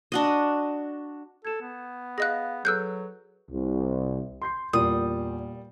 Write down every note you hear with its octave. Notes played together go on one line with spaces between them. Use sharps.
D4 F#4 D#5
A4 G#6 E7
B3
G#4 D#5 F5 F#6 A#6
F#3 G#4 A4 B4 E6 F#6 G6
C2
C6 G6 C7
E2 A#2 G3 D#6